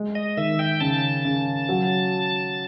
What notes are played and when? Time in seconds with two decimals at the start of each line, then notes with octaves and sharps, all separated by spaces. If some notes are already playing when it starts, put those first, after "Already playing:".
Already playing: G#3
0.15 D#5
0.37 D#3 E5
0.59 G5
0.80 C#3 A5
1.25 C#3
1.69 F#3